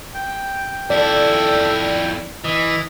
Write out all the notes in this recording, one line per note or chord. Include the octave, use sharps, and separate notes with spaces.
G5
F2 E4 A4 D5
E3 D#5